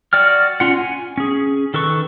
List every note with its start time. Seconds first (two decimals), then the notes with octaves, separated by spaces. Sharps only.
0.13 F#4 D5 G5 F6
0.60 C#4 F4 F#5
0.77 G#5
1.18 C#4 G#4
1.74 D#3 A4 B4 C#6